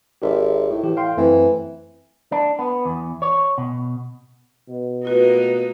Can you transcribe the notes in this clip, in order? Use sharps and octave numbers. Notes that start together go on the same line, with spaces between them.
G#1 G4 A#4 E5
A2
E3 G4
F5 G5 C6
F#2 E3 A3 C4
D4
B3
E2
C#5
B2
B2
A3 A#3 D#4 F4 F#4 B4